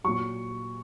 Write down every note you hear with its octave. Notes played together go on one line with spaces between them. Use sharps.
A#2 F#3 C#6